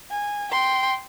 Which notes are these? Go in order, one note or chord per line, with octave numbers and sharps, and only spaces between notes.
G#5
G5 C6